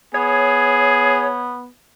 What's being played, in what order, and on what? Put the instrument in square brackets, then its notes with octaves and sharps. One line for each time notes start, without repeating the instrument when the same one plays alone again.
[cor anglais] B3 [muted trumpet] G#4 [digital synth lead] C#5